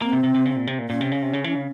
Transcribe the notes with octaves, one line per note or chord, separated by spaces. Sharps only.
A#3 C4
C3
C3
C3
C#3
C3
A#2
C3
A#2
A#2 C#4
C3
C#3
C3
C#3
E3
C#3